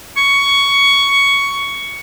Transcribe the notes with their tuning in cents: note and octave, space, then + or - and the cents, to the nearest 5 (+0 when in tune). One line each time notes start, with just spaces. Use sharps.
C#6 +10